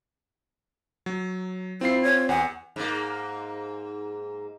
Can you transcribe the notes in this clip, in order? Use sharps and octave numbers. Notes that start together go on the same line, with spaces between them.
F#3
C4 E4 F4 C7
C#5 G#6
E2 F#5 G#5
G#2 A#3